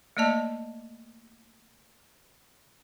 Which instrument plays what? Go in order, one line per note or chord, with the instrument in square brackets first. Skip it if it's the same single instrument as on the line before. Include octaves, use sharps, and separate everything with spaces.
[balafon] A3 A#3 D5 D#5 A5